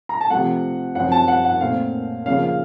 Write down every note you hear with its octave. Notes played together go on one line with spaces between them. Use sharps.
A#5
A5
C3 F3 A3 F#5
F#2 F3 C4 F#5
A5
F#5
F#5
A#2 A3 C4 F5
C#3 F3 A#3 F5
F5